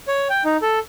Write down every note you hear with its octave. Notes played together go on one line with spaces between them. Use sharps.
C#5
G5
D#4
A4